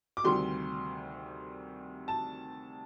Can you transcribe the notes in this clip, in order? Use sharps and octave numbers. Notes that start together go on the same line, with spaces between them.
D6
D2 C3 D#3 G3 C6
A5